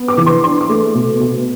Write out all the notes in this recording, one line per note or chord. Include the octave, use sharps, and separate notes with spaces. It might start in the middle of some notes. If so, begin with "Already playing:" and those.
Already playing: B3
D6
E3
C6
D4 C6
D6
A3
B2
B2